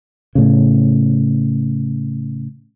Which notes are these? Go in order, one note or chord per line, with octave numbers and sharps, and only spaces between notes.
A2 C#3